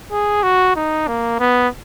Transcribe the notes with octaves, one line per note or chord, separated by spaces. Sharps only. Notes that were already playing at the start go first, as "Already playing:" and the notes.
G#4
F#4
D#4
A#3
B3